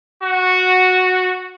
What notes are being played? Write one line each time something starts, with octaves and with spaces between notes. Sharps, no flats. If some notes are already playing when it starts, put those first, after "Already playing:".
F#4